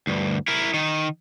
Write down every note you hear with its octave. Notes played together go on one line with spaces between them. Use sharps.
D2 G2
E4 A#4
D#3 D#4